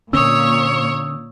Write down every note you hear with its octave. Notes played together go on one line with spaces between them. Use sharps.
A#2 D3 C4 C#4 C#5 D#6 E6